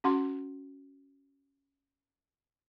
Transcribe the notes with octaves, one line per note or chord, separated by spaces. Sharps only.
C#4 F#4 F#5 C6